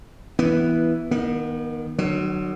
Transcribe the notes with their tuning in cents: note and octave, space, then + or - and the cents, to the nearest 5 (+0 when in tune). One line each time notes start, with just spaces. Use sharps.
E3 +0 B3 -10
D#3 +0 B3 -40
D3 +45 F#3 +0